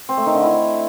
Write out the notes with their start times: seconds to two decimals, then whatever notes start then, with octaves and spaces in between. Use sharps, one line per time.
0.09 C4
0.17 A3
0.26 D#3
0.35 D3
0.43 E4